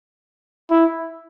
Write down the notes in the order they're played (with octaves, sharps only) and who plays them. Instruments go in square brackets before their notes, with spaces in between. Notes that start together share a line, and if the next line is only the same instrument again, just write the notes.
[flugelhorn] E4